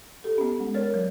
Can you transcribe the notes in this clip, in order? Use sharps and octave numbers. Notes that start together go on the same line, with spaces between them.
G4 A4
B3 C#4
G#3
A#4 C#5 D5 F6 A6
F#3